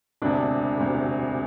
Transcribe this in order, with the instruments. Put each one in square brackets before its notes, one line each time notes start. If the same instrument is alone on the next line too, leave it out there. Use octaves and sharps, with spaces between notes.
[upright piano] E1 D2 C3 [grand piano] D4
[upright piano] E1 D2 C3